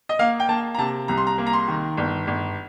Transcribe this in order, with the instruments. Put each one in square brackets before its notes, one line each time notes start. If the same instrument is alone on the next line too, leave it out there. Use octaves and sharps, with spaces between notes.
[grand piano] D#5
A#3 F5
G5
A#3 A5
A#5
C3 A5
C2 A#5
C6
A#5
A#3
A#5
C6
D#3
G1
G1